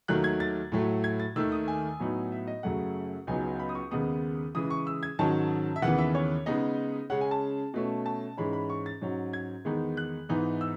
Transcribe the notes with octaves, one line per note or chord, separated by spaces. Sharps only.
D#2 D#3 F#3 A3 F#6
G#6
A6
A2 F#3 A3
G#6
A6
D#2 D#3 A3 E6
D#6
G#5
A2 F#3 B3 D#4
E5
D#5
F#2 C#3 F#3 A3 F#5
C#2 C#3 F#3 B3 D#4 G#5
B5
D#6
C#6
D#2 C#3 G#3 B3 D#4 D#6
C#3 E3 G#3 D#6
C#6
E6
G#6
G#2 D#3 F#3 C#4 A5
E5
D#2 C#3 E3 B3 F#5
E5
C#5
C#3 G#3 B3 D#4 D#5
C#3 G#3 C#4 F#5
G#5
A5
B2 A3 C#4
A5
G#2 E3 G#3 C#4 B5
B5
C#6
A6
G#2 F#3 C#4
G#6
E2 D#3 G#3 B3 D#4
F#6
G#2 E3 B3 D#4
E6